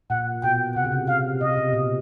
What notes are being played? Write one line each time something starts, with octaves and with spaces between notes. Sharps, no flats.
A#2 F#5
B2 G5
C3 F#5
C#3
C3
C3 F5
C3 D#5
B2
A#2